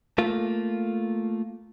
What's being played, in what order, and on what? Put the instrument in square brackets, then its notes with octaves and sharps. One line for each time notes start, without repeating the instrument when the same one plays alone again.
[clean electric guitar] A3 A#3 F4